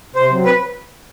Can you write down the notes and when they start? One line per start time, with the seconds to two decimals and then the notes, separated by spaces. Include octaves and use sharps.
0.15 C3 C5
0.30 F#3 C4
0.45 B4